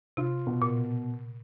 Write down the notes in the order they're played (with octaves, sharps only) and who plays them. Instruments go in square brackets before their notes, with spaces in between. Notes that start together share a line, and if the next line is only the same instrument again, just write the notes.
[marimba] C3 [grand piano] F4
[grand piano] B2
[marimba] A#2